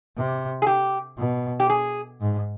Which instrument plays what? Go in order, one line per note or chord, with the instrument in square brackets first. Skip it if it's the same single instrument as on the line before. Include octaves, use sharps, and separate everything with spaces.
[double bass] C3
[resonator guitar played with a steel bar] G#4
G4
[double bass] B2
[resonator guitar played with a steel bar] G4
G#4
[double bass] G#2